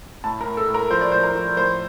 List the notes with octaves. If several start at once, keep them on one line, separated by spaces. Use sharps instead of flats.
A2 A5
A#4
A2
A4
A2
A#4
F3 C5
D5
A2 C5
A#4
F3
A2 C5